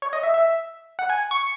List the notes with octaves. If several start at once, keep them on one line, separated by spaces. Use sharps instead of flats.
C#5
D#5
E5
E5
F#5
G#5
C#6